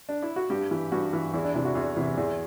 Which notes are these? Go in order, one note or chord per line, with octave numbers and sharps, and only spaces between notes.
D4
E4
F#4
G2 G4
E3
G2 F#4
E3
E2 E4
D4
C3 E3
F#4
E2
C3 E3
E2